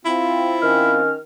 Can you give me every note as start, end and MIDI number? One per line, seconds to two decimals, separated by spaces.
0.05 1.02 60
0.05 0.97 64
0.05 1.02 65
0.62 1.15 51
0.62 1.15 61
0.62 1.15 89